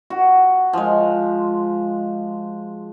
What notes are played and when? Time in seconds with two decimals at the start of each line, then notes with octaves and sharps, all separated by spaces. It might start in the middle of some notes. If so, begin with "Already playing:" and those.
0.10 F#4
0.73 F3 G#3